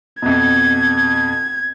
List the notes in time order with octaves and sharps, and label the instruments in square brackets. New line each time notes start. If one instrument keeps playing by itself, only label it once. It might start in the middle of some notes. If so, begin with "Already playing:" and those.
[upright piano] F2 B2 [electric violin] G#6